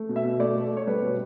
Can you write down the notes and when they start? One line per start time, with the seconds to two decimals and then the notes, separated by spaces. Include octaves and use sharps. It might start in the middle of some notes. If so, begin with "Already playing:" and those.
Already playing: A3
0.09 B2
0.16 E5
0.25 B2
0.39 A3 D5
0.56 A3
0.72 A3 C#5
0.87 G3 B4
1.02 B2